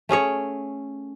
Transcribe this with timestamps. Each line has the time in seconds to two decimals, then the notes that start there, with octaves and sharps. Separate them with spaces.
0.09 A3 C#4 G#4 C#5